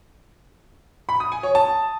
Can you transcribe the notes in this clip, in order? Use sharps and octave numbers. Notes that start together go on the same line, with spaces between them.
B5
D#6
G#5
C#5
A5